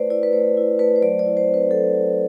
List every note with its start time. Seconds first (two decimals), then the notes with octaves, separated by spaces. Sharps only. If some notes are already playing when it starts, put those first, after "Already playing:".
Already playing: A3 E4 B4 C5 D5
0.10 E4 D5
0.23 B4
0.33 A3 C5
0.57 E4
0.79 A3 B4
0.96 C5
1.02 F#3 D5
1.19 D5
1.26 E4
1.37 C5
1.48 C4
1.54 B4
1.71 F#3 A4
1.94 F#3